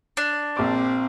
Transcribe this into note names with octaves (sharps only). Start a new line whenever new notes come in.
D4
A#1 C4 D6